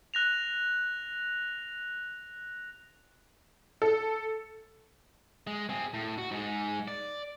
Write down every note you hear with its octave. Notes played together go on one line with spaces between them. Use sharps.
F#6 A#6 F7
A4
G#3
C4 G#4
A2
F#4
G#2 G#3
D5